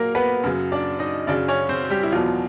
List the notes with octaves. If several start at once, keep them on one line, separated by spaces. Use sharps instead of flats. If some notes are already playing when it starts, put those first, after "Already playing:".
Already playing: A#2 F#3 A#3 A#4
B3 B4
F#2 C#3 F#3
D4 D5
D#4 D#5
F#2 C#3 F#3 D4 D5
C#4 C#5
C4 C5
G3 G4
E4
E2 B2 F3 F#3 F4